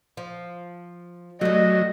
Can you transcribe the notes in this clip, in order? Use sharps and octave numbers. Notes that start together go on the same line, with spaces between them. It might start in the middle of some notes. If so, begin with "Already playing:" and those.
F3
F#3 G3 A3 D#5